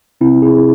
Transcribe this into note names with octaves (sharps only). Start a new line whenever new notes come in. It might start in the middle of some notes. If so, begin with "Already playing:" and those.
C3 C4 E4
E4 G#4